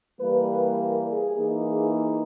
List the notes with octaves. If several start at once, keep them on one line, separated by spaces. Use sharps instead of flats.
E3 G3 A#3 B4
A#4
G#4
E3 A#3 D#4
G#4